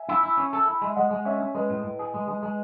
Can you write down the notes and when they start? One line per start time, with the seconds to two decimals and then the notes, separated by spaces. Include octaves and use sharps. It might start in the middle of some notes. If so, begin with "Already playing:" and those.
Already playing: E5 G#5
0.09 E4
0.23 E4
0.37 C#4
0.53 A4
0.68 E4
0.82 G#3
0.87 E5
0.96 G#3 D#5 F#5
1.11 G#3
1.25 C#4 C#5 E5
1.40 C#4
1.55 G#3 B4 D#5
1.70 A2
1.84 A2
1.99 G#4
2.14 G#3
2.28 G#3
2.43 G#3